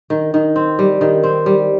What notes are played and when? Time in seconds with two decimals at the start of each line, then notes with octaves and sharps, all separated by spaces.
0.10 D#3
0.34 D#3
0.56 C4
0.79 G3
1.01 D#3
1.23 C4
1.46 G3